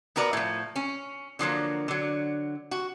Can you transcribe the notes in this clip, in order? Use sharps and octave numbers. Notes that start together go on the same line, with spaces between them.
B3 F#4 A#4 B4 D5
A2 F3
C#4
D3 F3 F#3 A#3
D3 F#3
F#4